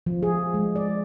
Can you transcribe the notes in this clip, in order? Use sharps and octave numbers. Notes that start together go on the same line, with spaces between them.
F3
G#4
G#3
D5